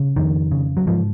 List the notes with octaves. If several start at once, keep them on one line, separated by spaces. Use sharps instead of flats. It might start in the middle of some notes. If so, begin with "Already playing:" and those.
Already playing: C#3
F2 D#3
C#3
F#3
G#2 F3